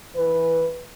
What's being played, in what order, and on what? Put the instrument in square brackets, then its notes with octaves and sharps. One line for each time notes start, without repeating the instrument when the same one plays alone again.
[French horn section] E3 B4